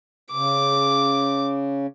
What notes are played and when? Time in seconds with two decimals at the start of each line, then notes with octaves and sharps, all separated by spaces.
0.33 C#3 D6